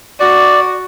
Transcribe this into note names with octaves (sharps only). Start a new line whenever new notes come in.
F#4 D5